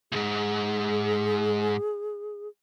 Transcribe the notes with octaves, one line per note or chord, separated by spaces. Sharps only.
C#2 G#2 G#4